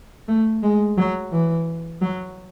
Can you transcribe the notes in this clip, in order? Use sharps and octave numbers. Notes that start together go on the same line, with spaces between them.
A3
G#3
F#3
E3
F#3